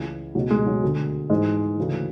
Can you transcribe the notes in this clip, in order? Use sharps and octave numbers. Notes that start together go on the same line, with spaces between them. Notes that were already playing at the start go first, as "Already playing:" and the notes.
Already playing: C#2 C#3 E3
C#2 B2 F#3
G#3
F#3
D2 D3
G#2 E3 G#3
D2 C#3 E3